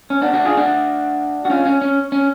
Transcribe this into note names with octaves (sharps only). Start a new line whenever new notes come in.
C#4
B3 D4
D4 F#4
F4 G#4
D4 F#4
F#4
C#4 F4
C#4
C#4
C#4